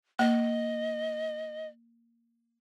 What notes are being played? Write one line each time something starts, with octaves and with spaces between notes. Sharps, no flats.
A#3 D#5